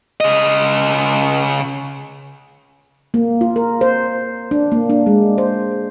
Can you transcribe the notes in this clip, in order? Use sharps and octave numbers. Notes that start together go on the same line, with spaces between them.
C#3 D#5
A#3
F4
A#4
C5
D4
A#3
D4
G#3
C5